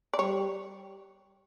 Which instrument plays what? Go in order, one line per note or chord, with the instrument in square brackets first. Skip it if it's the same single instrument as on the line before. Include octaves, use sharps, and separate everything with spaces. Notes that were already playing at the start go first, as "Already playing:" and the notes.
[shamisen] D5
[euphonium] G3 [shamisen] C#5